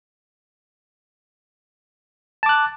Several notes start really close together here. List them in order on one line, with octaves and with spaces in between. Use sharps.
A5 D6 F#6